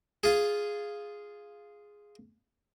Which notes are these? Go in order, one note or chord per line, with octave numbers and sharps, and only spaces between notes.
F4 G#4